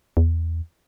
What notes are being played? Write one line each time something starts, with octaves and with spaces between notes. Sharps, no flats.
E2